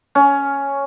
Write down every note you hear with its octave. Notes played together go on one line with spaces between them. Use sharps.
C#4